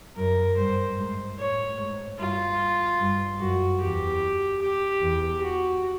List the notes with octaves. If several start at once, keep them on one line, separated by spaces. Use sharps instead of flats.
F#2 A#4
G2 C5
G#2
A2 C#5
G#2
G2 F4
G2
F#2 F#4
E2 G4
G4
E2
F#4